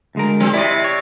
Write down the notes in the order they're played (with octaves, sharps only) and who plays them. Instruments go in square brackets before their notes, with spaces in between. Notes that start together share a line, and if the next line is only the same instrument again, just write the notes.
[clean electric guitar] D2 G#3 A#4
[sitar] F#3 C4
[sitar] C3 D5 [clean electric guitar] E4 D#5
[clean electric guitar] C#5